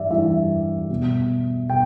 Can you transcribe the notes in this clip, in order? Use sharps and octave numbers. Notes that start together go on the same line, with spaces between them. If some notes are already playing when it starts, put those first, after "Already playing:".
Already playing: G2 E3 G3 D5 E5
G2 E3 G3 E5
B2 G3
B2 G5